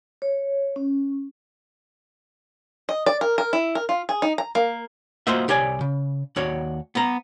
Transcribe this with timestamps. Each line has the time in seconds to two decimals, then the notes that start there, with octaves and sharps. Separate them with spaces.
0.22 C#5
0.76 C#4
2.89 D#5
3.06 D5
3.21 A#4
3.38 A#4
3.53 E4
3.75 A#4
3.89 F4
4.09 G#4
4.22 D#4
4.38 A#5
4.55 A#3
5.27 A#3 F4 F#4 C5 D#5 E5
5.48 C2 G4 C#5 D5 G#5
5.81 C#3
6.36 D#2 F#4 C#5 D5
6.95 B3 A#5